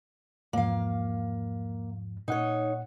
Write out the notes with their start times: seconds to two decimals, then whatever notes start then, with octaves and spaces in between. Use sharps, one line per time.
0.53 E2 G#2 F3 A#3 F5
2.28 A#2 D#4 C#5 F#5